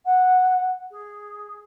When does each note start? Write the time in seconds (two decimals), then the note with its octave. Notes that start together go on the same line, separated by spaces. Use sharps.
0.05 F#5
0.91 G#4